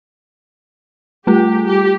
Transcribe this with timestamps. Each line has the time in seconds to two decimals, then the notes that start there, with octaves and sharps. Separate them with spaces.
1.27 G3 A3 F4 G4
1.67 G4